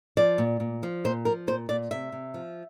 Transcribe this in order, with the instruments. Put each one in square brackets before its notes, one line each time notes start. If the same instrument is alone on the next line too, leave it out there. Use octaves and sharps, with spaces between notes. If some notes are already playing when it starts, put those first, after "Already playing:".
[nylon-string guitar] F3 D5
A#2
A#2
F3
A#2 C5
F3 A#4
A#2 C5
A#2 D5
C3 E5
C3
F3